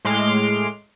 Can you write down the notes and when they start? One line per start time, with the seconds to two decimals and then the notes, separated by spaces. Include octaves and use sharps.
0.05 A2 G#3 C6 D6 F6